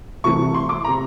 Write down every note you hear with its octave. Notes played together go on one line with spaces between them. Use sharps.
C2 C3 E3 A3 C#6
C6
D6
A#5
C3